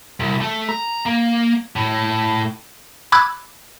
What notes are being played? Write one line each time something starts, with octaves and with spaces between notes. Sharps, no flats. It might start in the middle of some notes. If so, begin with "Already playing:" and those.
C2
A3
A#5
A#3
A2
B5 D6 E6 F#6 G#6